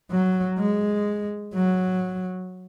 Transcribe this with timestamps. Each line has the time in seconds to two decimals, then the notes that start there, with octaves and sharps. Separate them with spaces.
0.11 F#3
0.59 G#3
1.54 F#3